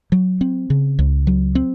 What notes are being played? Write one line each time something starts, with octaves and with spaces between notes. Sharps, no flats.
F#3
C4
C#3
C#2
F#3
C4